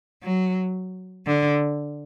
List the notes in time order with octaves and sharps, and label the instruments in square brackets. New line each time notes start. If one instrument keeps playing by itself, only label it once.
[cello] F#3
D3